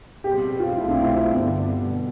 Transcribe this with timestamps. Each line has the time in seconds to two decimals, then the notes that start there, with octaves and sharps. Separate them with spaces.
0.24 B2 G3 C4 G4
0.60 F4
0.77 C2 B2 A3 C4 E4
0.89 D4
1.03 E4
1.15 F4
1.29 G2 D3 G3 B3
1.81 B2